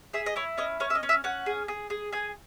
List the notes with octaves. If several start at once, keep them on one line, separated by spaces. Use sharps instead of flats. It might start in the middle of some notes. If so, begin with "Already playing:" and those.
G#4 E5
D#5
E4 C#5
C#4 D#5
C#4 C#5
E5
D#5
C#4
E5
C#4 F#5
G#4
G#4
G#4
G#4 G#5